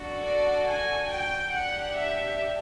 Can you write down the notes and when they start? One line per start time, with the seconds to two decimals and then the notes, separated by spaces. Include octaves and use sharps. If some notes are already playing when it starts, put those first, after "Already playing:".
Already playing: D4 F#4 A4
0.24 D5
0.68 G#5
1.10 G5
1.53 D4 G4 F#5
1.96 E5